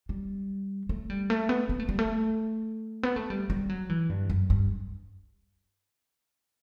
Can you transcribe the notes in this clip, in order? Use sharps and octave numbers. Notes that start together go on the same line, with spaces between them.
G3
A3
G3
A3
B3
B3
A3
G3
A3
B3
A3
G3
G3
F#3
E3
G2
F#2
G2